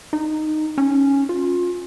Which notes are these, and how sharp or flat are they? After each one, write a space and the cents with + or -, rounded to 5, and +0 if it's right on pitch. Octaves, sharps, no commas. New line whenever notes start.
D#4 -10
C#4 +0
F4 +25